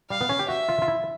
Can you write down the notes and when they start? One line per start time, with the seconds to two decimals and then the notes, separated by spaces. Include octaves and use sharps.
0.10 G3 F5
0.21 B3
0.29 C#4
0.39 G4
0.48 F#4 E5
0.69 F4
0.82 F4
0.88 E4